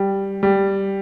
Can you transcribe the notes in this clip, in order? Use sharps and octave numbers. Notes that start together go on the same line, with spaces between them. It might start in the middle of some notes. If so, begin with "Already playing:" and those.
Already playing: G3
G3